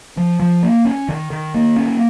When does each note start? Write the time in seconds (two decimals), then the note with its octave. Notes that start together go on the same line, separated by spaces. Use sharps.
0.17 F3
0.40 F3
0.63 A#3
0.85 C#4
1.08 D#3
1.31 D#3
1.54 A#3
1.76 C#4